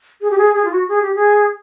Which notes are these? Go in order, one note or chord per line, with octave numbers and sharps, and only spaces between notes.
G#4
G4
G#4
G#4
F4
F#4
G#4
G4
G#4